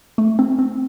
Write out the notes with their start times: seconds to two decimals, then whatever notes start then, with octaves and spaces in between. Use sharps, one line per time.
0.18 A3
0.39 C4
0.59 C4